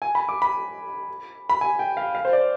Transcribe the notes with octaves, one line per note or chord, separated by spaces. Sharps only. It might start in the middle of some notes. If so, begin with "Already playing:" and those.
G#5
B5
D6
B5
B5
G#5
G5
F5
F5
C5
D5